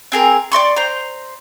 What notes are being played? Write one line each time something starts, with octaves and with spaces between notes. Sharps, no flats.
C4 G#4 A#4
D5 D#5 C6 C#6
C5 A#5